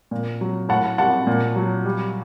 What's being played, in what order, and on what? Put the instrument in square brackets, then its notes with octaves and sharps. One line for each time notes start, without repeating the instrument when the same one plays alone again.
[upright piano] A#2
F#3
A2 F#5 A5
G3 F#5 A5
A#2
F#3
G3